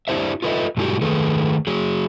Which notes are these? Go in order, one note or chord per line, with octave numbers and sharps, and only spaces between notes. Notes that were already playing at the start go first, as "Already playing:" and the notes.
D4 E4 G4 C5 E5
F4 A4 B4 C#5 D#5 E5
G2 B2 G#3 E4 F#4 G4
D#3 A3 G#4 A4 B4
F#3 G#4